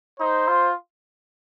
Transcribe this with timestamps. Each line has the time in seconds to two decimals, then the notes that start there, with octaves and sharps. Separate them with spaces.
0.20 D#4 C5
0.48 F4